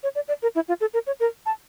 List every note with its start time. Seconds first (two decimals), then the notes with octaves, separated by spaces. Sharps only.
0.03 C#5
0.15 D5
0.28 D5
0.42 A#4
0.55 E4
0.68 F4
0.81 A4
0.94 A#4
1.07 C#5
1.20 A#4
1.46 A5